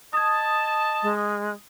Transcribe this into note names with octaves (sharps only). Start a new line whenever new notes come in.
D#5 A5 D#6 G#6
G#3